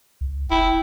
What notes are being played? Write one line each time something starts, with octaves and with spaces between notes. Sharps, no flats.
C#2
F1 E4 G5